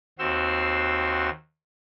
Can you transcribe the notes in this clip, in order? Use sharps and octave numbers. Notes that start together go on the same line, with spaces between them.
D#2 C4 F#4 C6 E6